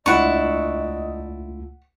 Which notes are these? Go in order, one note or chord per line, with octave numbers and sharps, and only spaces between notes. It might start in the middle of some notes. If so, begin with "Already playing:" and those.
C#2 A3 D4 E4 F4 D#5 F#5 C#6